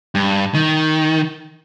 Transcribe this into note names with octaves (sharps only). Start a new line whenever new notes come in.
G2
D#3